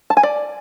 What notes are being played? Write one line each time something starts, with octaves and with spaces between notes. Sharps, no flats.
A5
G#5
D5